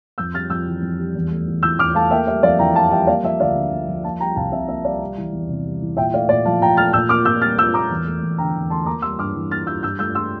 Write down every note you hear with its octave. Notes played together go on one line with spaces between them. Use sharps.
F2 E6 G6
G3 F6 A6
F2 E6 G6
E3
F2
G3
E2
A3
E2
E3 E6 G6
E2 D6 F6
A3 F5 A5
A#3 E5 G5
G3 E5
F2 D5 F5
E3 G5 A#5
A#3 F5 A5
G3 E5 G5
A#3 D5 F5
F3 E5
D2 D5 F5
D3
A#3
F3
A#3 F5 A5
G3 G5 A#5
C2 F5 A5
C3 E5
A#3 E5
G3 D5 F5
G3
E3
E2
C3
G3
E3
A#2 E5 G5
A3 D5 F5
A#2 D5 F5
F3 F5 A5
A#2 G5 A#5
A3 F6 A6
A#2 E6 G6
A#3 D6 F6
A#2 E6 G6
G3 F6 A6
A#2 E6 G6
A#3 A#5 D6
E2
A3
E2
D3 G5 A#5
E2
A3 A5 C6
A#3 A#5 D6
G3 C6 E6
G2 D6 F6
E3
A#3 F6 A6
G3 E6 G6
G2 E6 G6
A3 E6 G6
C6 E6